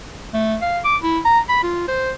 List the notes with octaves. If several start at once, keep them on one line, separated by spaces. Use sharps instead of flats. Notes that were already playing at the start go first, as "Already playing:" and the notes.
A3
F5
D6
E4
A#5
B5
F4
C5